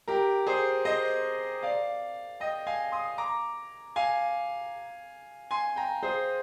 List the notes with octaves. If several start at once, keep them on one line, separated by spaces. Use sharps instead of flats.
G4 A#4
G#4 C5
C5 D#5
D5 F5
D#5 G5
F5 G#5
C6 D#6
A#5 D6
F5 G#5
G#5 C6
G5 A#5
G#4 C5